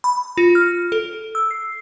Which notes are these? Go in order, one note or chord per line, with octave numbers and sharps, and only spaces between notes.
B5
F4
F6
A4
E6
C7